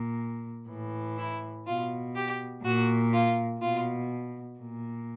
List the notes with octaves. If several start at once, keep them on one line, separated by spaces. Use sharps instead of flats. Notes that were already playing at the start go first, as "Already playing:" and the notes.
Already playing: A#2
A2 E3
E4
B2 F4
G4
A#2 F#4
F4
B2 F4
A#2